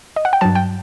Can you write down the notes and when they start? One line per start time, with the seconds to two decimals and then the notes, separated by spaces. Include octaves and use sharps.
0.16 D#5
0.25 F#5
0.33 G5
0.41 G2 F#3 A5
0.55 G5